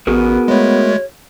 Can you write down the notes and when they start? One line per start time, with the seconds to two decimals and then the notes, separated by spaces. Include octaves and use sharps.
0.07 A1 B3 F#4 G#4 A#4
0.48 G#3 A3 C#5